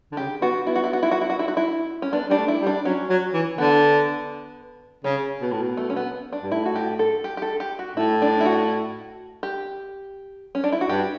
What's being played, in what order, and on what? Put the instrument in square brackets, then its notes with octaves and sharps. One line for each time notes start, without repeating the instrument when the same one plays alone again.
[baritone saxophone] D3
[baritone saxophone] C#3 [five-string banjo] G4
[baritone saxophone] B3 [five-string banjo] F#4
[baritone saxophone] B3 [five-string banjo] E4
[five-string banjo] F#4
E4
F#4
E4
F#4
E4
F#4
E4
F#4
E4
C#4
[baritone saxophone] B3 [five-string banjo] D4
[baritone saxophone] G3 [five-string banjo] D4
[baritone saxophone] A3
[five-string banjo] E4
[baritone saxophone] G3
[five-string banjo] D4
[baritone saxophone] F#3 [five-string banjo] C#4
[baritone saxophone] F#3
E3
[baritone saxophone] D3 [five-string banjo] B3
[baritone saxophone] C#3 [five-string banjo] C#4
[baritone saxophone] B2
A2
B2
[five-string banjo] A3
C#4
B3
D4
[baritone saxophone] G2
[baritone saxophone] A2 [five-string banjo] E4
[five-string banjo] F#4
G4
A4
G4
G4
A4
G4
F#4
[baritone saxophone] A2 [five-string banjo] E4
[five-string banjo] D4
E4
F#4
G4
C#4
D4
E4
F#4
[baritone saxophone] G2 [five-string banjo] G4